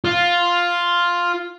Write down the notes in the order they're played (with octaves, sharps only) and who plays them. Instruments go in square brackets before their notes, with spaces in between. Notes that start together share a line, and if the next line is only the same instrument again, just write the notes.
[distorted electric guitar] F4